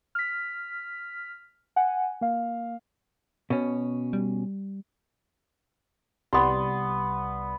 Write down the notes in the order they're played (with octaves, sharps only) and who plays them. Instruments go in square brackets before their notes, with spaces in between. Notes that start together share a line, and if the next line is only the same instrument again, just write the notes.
[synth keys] F6 B6
F#5 G#5
A#3 F5
[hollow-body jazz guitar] B2 C#4
[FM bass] G3
[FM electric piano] C2 G3 D5 [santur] B3 C6